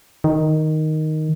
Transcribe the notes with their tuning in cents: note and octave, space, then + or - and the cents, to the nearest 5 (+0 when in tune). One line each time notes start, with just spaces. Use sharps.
D#3 +0